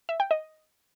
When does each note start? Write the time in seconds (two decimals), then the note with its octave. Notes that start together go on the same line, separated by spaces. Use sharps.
0.09 E5
0.20 G5
0.31 D#5